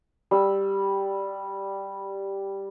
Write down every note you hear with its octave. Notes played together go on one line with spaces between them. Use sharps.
G3 E6